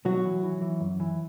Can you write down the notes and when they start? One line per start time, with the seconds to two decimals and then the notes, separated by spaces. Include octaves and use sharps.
0.05 B1 F#3 F#4
0.25 E3
0.43 E3
0.61 E3
0.81 F#2
1.00 E3